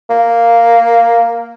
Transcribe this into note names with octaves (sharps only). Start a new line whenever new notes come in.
A#3